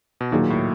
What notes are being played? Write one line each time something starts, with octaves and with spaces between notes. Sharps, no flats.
B2
A#2 D#3 F#3 A#3 D#4 G#4
A2